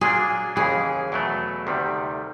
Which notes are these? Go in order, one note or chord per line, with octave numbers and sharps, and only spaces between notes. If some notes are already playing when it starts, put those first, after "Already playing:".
A#2 F#3 A#3 D4 G#4
D#2 C#3 E3 G#4
E2 B2 F#3 A3
D2 C3 D#3 G3